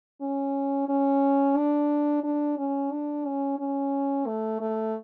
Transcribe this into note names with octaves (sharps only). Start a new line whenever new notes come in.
C#4
C#4
D4
D4
C#4
D4
C#4
C#4
A3
A3